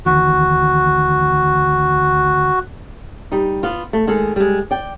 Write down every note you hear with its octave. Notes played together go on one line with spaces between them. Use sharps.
D2 D#3 E3 F#4
G3 D#4
B3 F4
A3
D#3 G#3 A4
G3 G#3
D5 G5